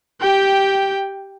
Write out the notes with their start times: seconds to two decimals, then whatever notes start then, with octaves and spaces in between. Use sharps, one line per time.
0.21 G4 G5